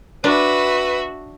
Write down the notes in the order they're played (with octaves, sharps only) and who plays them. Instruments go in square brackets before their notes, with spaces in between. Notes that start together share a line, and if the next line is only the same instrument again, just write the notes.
[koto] D4 [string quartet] F#4 E5 [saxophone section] B4